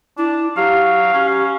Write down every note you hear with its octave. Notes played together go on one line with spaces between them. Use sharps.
D4 E4
F#3 G4 F5
C#4 G4